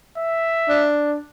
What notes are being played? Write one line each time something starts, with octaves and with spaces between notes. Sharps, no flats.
E5
D4